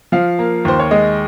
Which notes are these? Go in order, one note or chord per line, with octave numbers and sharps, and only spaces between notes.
F3 F5
A#3
D#2 C5
C#5
G#3 D#5